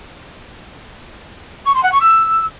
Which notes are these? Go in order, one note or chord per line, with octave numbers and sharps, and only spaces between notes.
C#6
C6
F#5
C#6
E6